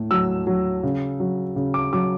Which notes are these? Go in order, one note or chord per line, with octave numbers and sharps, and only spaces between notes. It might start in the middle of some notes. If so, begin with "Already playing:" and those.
Already playing: A2
F#3 E6
F#3
C#3
F#3
C#3
D6
F#3 D6